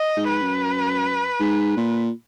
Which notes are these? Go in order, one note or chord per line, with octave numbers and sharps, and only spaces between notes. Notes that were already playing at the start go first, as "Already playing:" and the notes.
Already playing: D#5
G#2
B4
F#2
G#2
A#2